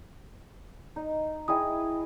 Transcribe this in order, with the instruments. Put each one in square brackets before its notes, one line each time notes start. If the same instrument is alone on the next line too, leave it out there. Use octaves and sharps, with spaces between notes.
[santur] D#4
[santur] E4 G#4 D#5 [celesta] G5 D#6